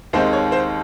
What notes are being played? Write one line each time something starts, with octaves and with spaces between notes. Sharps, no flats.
D#2 D#3 G#3 C4 D#4 C5
C#5
C5